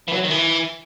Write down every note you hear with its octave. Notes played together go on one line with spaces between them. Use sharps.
E3
F#3
D#3
E3